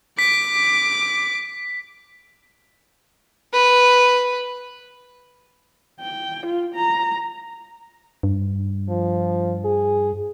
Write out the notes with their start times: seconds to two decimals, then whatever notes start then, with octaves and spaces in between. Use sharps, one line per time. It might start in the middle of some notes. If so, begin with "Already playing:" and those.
0.19 D6 B6
3.53 B4
6.00 G5
6.46 F4
6.75 A#5
8.23 G2
8.89 F3
9.65 G#4